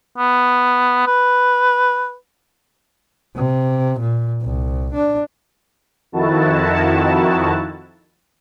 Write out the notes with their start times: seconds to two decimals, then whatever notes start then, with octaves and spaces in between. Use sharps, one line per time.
0.18 B3
1.06 B4
3.36 C3
3.99 A#2
4.42 C2
4.94 D4
6.12 F2 D#3 E4 F#4 A5